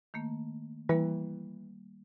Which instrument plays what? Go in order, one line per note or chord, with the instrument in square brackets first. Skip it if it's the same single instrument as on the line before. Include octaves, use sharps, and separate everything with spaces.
[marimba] D#3 A3 A#3
[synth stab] E3 [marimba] G3 A#3